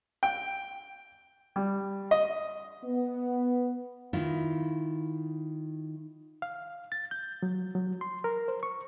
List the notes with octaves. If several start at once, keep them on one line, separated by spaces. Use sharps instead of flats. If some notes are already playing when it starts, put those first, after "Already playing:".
G5
G3
D#5
B3
D#3 E4 F4
F5
A6
G6
F#3
F#3
C6
A#4
C5
C#6